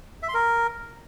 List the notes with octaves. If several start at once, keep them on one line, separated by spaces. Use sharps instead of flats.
E5
C6
A#4